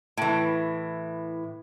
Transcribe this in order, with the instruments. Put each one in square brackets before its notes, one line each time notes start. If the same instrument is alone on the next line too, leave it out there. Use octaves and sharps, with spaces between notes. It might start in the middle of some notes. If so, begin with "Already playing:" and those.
[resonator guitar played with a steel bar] A2 E3